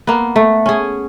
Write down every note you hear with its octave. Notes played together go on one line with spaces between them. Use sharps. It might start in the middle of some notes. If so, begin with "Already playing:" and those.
A#3 B3
A3
C#4 G#4